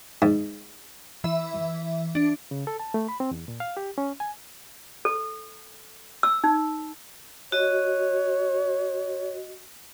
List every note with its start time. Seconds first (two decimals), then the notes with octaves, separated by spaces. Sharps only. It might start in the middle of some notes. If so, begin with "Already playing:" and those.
0.22 G#2
1.24 E3 E5
2.15 D4
2.51 C#3
2.67 A4
2.80 A5
2.94 A3
3.09 B5
3.20 C4
3.31 E2
3.48 A#2
3.60 F5
3.77 G4
3.98 C#4
4.20 G#5
5.05 A4
6.23 E6
6.44 D#4
7.52 F#4 C#5 D#5